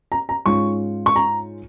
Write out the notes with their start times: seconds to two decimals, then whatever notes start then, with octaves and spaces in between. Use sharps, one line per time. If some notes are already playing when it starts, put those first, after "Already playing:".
0.12 A#5
0.29 A#5
0.46 G#2 G#3 C#4 F4 C#6
1.06 C#6
1.16 A#5